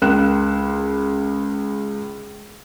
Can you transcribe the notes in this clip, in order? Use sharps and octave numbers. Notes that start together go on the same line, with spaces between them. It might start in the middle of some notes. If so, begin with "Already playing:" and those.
C#2 A#4 F#6 E7